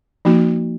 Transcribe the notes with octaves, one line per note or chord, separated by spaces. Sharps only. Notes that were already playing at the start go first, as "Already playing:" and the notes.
F3 A#3 D#4 F#4